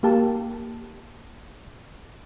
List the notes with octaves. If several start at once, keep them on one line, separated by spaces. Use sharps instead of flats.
A#3 G4 A5